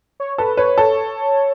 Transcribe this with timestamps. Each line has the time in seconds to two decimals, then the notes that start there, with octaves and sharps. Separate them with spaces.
0.20 C#5
0.38 A4 B4
0.57 B4 C#5
0.78 A4